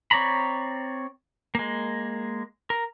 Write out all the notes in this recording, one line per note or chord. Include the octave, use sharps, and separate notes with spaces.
C4 C#5 D5 A#5 B5
G#3 A#3
A#4